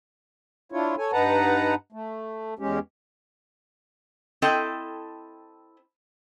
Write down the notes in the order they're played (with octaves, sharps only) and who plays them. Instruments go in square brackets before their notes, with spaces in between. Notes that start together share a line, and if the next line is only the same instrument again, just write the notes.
[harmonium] D4 E4 F4 C#5
A4 C#5 G#5
G2 D#4 B4 F#5 A5 A#5
A3
E2 G#3 C#4 G4
[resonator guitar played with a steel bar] C4 E4 A4 D#5 G5